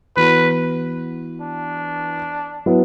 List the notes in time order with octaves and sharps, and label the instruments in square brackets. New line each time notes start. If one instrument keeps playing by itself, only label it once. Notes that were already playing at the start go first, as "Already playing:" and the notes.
[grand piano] E3 B3 F#4 [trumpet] B4
[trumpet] D4
[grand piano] F#3 B3 E4